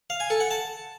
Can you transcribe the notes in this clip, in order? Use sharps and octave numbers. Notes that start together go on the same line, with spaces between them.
F5
G#5
A4
F#5
A5